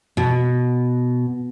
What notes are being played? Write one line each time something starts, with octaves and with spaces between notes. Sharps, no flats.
B2